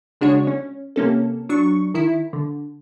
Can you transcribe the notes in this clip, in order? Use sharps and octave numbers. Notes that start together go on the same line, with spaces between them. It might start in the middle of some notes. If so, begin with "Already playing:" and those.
C#3 G#3 D4 F#4 C#5
C#4
C3 A#3 C#4 A4
F#3 D4 C#6
D#3 E4
D3